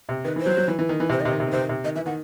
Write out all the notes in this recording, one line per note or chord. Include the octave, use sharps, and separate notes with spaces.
C3
D#3 B4
E3 C5
F#3
F#3
E3
E3
D#3
E3
C3
C5
D#3
C3 D#5
D#3
C3
D#3
C3 C5
D#3
C3
D#3 D#5
E3 E5
D#3 F#5